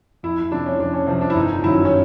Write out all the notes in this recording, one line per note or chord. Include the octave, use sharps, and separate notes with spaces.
F2 E4
E4
C3 F3 D4
C#4
F2 D4
C#4
C3 F3 C4
D4
E4
G1 D#4
F#2 D#3 F#3 E4
C#4